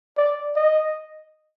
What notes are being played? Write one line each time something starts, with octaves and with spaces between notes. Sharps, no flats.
D5
D#5